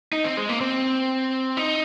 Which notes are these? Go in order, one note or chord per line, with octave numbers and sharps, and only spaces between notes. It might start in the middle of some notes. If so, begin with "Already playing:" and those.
D#4
C4
G#3
A#3
C4
D#4